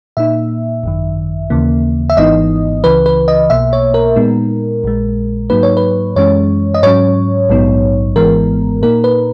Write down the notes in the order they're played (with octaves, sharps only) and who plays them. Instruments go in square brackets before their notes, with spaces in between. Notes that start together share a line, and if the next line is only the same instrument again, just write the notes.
[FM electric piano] A#2 A#3 D#4 E5
G#1 F#2 D#3
D#2 C#3 E3 A#3
E5
G#1 G#2 E3 B3 D#4 D#5
C#2 C#3 E3 B4
B4
D#5
B1 B2 A#3 E5
C#5
A#4
A#2 G#3 B3 D#4
A#1 A#2 G#3
G#2 F#3 A#3 D#4 B4
C#5
B4
F#2 E3 G#3 C#4 C#5
D#5
G#2 F#3 C#4 C#5
A#1 G#2 F#3 B3 D#4
G#1 G#2 E3 G#3 B3 A#4
A#2 A#3 D#4 A#4
B4